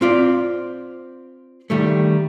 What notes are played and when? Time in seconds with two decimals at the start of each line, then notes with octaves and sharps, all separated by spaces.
0.01 C4 F4 D5
1.70 D#3 G3 A3